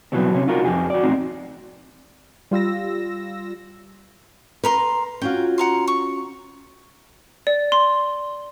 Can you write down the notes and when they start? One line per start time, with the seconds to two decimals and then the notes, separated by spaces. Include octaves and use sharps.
0.12 B2 E3 F#3 G3 C4
0.34 C3 C#4
0.47 D#4 F4 F#4 A#4
0.65 F2 G#2 G4 G#4
0.90 F#4 D5
1.03 E2 A2 C4 D#4
2.51 G3 F4 E6 A#6
4.64 A#4 B4 A#5 C6
5.21 C#4 F4 F#4 G5
5.58 F#5 A#5 C6
5.88 C#6
7.47 D5
7.72 C6